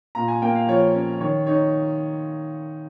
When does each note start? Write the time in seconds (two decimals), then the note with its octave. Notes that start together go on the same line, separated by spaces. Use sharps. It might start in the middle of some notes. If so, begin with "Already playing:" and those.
0.15 A#2 A#5
0.28 G#5
0.42 A#3 G5
0.55 F5
0.68 F3 C#5
0.95 C#4
1.21 D#3 C#5
1.47 D#4 C#5